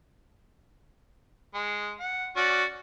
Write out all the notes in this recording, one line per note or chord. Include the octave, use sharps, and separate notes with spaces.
G#3
F#5
C#4 F#4 D5